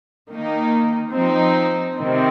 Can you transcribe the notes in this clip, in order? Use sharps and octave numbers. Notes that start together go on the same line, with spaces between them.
D#3 A#3 D#4
F3 C4 D#4
C3 D#3 C4